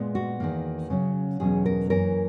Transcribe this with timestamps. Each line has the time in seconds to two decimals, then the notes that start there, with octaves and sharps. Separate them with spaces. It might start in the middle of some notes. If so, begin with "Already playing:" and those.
Already playing: A#2 G#3 B3
0.15 F#4
0.40 E2 D#3 A#3
0.90 C#3 F#3 C#4
1.40 E2 B2 F#3 C#4 G#4
1.66 A#4
1.90 F#2 E3 A#3 A#4